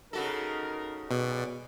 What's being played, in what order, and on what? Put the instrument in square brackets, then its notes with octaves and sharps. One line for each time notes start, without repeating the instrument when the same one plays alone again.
[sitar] C#3 F#4 A4 [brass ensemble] D#4 A#4
[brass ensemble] B1 G#4 D5 [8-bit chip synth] B2